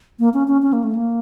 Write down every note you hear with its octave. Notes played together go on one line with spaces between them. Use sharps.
A#3
C#4
C#4
C#4
A#3
A3
A#3